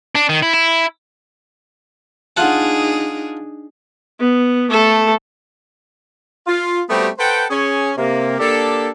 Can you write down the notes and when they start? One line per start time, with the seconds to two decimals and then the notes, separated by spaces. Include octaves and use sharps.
0.15 D4
0.29 D#3
0.43 E4
0.54 E4
2.37 D4 D#4 F4 G#4 F#5 A5
4.20 B3
4.71 A3 A4
6.47 F4
6.89 G3 A3 B3 C4 F#4 G4
7.18 A4 B4 C5 F#5 G5
7.50 C#4 G#4 C#5
7.98 C3 A#3
8.39 A#3 D4 G4 A4